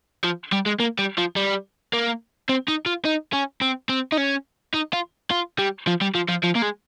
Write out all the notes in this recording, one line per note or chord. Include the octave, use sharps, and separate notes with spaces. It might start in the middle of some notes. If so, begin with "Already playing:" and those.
F3
G3
G#3
A#3
G3
F3
G3
A#3
C4
D#4
F4
D#4
C#4
C4
C4
D#4
C#4
D#4
F4
F4
G3
F3
G3
F3
F3
F3
A#3
G#3